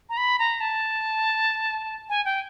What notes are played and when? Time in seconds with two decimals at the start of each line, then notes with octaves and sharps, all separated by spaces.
0.09 A#5
0.17 B5
0.39 A#5
0.60 A5
2.09 G#5
2.25 G5